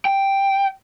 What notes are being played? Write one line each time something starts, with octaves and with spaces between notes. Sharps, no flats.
G5